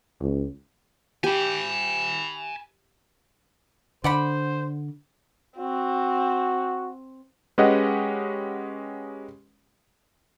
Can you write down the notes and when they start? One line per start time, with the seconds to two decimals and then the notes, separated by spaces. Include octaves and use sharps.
0.21 C#2
1.24 G4 G#5 B5
4.04 D3 C5 D5 F#5 B5
5.58 C4 F#4
7.58 G#3 C#4 G4 B4 D#5 F#5